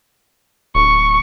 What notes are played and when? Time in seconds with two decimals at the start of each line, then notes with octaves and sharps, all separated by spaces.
0.75 D1 C#6